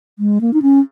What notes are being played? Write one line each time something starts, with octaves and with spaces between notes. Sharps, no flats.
G#3
A#3
D#4
C#4